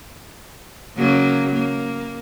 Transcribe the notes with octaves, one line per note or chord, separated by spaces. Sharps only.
C#3 F#3 A#3
A#3